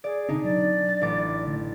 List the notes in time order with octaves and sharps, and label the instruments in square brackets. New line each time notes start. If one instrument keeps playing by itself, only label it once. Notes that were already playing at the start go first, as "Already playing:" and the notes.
[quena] G#4 [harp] D5
[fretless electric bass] B2 D3 C4 [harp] D4 D#4
[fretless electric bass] F#3 [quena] D5
[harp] A6
A1 D6
[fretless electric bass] D3 E3 A3